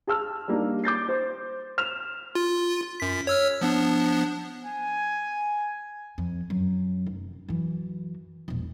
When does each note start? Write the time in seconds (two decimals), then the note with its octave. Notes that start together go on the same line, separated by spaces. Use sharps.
0.07 G#4 A5 E6 F6
0.48 G3 A#3 D4 D#4
0.84 D6 G6 A6 C7
1.09 C5
1.78 F6 E7 F7
2.35 F4
3.00 F#2 B6
3.27 C#5 E6 F6
3.61 F3 B3 D4
4.65 G#5
6.18 F2
6.50 F#2
7.06 F1
7.49 F#2 E3
8.48 E1 A#1